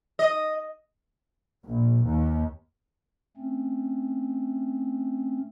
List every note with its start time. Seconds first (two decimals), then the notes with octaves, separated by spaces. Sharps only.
0.19 D#5
1.65 A#1
2.06 D#2
3.37 A3 C4 C#4